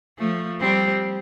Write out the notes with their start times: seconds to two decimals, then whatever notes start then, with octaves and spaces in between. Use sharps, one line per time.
0.18 F3 A3
0.60 G3 C4